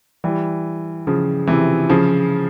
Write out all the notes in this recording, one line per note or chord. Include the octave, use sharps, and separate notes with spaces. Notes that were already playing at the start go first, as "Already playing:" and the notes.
E3 G3
C#3 F3
C3 E3
C#3 F3